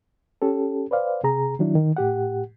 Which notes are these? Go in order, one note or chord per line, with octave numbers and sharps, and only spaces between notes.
C#4 G4 A4
B4 C5 D5 F5
C3 G#4 A#5
D#3 F#3 D4 E4
D#3
A2 G4 F#5